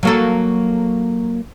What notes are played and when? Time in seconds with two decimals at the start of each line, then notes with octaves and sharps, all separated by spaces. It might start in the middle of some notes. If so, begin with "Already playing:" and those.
0.03 F#3 A#3 A4